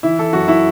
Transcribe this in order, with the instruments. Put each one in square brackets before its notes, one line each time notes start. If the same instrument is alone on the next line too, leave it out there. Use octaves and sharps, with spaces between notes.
[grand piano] E3 E4
E3 A4
F#2 F#4
E4